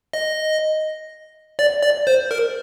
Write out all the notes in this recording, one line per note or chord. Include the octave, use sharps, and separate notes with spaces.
D#5
D5
D5
C5
A#4